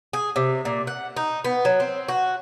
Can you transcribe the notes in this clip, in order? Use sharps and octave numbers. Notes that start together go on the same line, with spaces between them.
G#4
C3
A#2
F#5
D#4
B3
F#3
C4
F#4